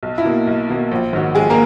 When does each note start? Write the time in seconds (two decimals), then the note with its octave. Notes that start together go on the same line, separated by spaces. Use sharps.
0.03 B1
0.18 E4
0.25 B2 A#3
0.47 B1
0.69 B2 A#3
0.91 A#1
1.13 G#2 D#3 F#3
1.35 A#1 G#3 G#4
1.50 A#3 A#4